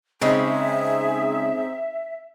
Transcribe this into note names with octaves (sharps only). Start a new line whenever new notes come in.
C#3 G#3 C4 C#4 D#4 G#4 E5